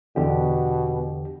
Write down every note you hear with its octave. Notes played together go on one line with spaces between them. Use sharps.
E2 B2 D3 G4